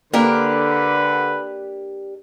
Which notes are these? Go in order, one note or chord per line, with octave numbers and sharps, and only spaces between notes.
D3 A#3 D4 G4 A#4 B4